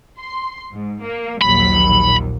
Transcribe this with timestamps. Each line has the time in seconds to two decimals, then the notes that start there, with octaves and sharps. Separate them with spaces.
0.19 C6
0.73 G#2
1.01 A#3
1.42 A#1 D#2 F#3 B5